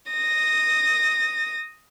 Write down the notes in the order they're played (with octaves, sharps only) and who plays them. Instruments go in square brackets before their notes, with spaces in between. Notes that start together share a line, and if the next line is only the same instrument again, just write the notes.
[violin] D#6 A#6